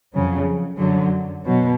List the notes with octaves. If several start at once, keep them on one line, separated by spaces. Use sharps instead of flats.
F2 C#3 F#3
F#2 D3 F#3
B2 F#3